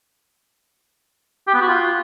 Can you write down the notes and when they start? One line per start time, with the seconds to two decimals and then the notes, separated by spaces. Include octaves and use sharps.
1.47 G4
1.54 B3
1.61 F#4
1.68 F4